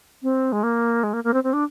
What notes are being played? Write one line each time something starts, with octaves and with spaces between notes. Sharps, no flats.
C4
G#3
A#3
G#3
A#3
A#3
C4
C4
D4